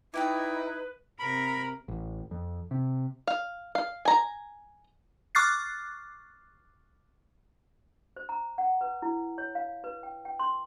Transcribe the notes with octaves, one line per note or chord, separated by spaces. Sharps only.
D#4 E4 B4 D5 G5 D6
C3 A#4 B5
A1
F2
C3
F5
F5
G#5 A#5
C#6 D6 F6 F#6 A6 C7
C5
A#5
F#5
B4
E4
C#5
F5
B4
G5
G5
C6